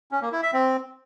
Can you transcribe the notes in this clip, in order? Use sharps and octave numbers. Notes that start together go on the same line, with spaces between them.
C#4
A#3
E4
E5
C4